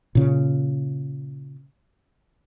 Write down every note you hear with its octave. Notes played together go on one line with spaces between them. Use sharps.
A#2 C#3